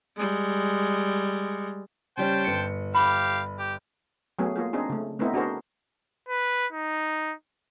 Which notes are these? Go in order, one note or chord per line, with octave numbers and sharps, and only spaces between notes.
G3 G#3
C#3 G3 C#4 C5 G5 A5
G1 C#7
G4 F5 B5
G4
F#3 A3 B3 C#4 G#4
A#3 F4 G#4
C4 D4 D#4 G#4
C#3 A3
A3 B3 C4 D#4 E4
D4 F#4 G#4 A#4 C5
B4
D#4